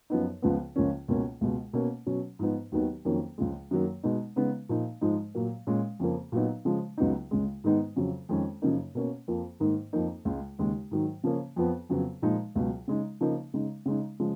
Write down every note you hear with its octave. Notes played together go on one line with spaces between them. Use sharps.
F#2 F3 B3 D#4
C#2 C#3 F3 B3
C#2 C#3 F3 A#3 C#4
C#2 B2 A#3 C#4
C#2 B2 G#3
B2 A#3 C#4
B2 F#3 C#4
G#2 F3 B3 D#4
D#2 D#3 F#3 B3 D#4
F2 D#3 F#3 A#3 C#4
C#2 C#3 F3 G#3
F#2 D#3 F#3 A#3
B2 G#3 B3 D#4
C#3 G#3 B3 D#4
A#2 F3 A#3 D#4
G#2 F3 G#3 D#4
A#2 F#3 A#3
A#2 G#3 C#4
F2 C#3 F3 A#3
A#2 F#3 B3 D#4
C#3 F3 G#3
C#2 C#3 F#3 B3 D#4
C#2 C#3 G#3
G#2 D#3 G#3 B3 D#4
F2 C#3 F#3
F2 D#3 G#3 C#4
F#2 C#3 F3 A#3 D#4
B2 A#3 C#4
F2 F3 A#3
G#2 D#3 A#3 D#4
F2 F3 A#3 D#4
C#2 C#3 G#3
D#2 C#3 G#3
G#2 D#3 F#3
C#3 F3 A#3 C#4
F2 F3 B3
F2 C#3 F#3 B3
A#2 F3 G#3 D#4
C#2 B2 F#3
C#3 G#3 D#4
C#3 F3 A#3 D#4
C#3 G#3 D#4
C#3 G#3 D#4
C#3 F3 G#3